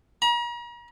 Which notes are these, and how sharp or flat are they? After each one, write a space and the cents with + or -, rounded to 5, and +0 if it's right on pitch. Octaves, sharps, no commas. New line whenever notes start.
A#5 +40